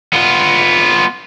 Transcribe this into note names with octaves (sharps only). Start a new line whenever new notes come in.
B3 F4